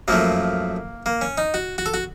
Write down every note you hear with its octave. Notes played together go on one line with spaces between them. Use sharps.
F#2 F3 A3 A#3
A#3
C#4
D#4
F#4
F#4
A4
F#4